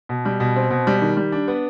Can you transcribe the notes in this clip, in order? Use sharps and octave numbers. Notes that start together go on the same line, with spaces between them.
B2
G3
B2
C4
B2
G3
D#3
G3
D4
B3